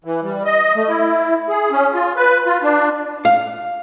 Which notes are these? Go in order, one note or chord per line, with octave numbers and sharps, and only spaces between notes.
E3
G3
D#5
A3
E4
G#4
C#4
F4
B4
F4
D4
F5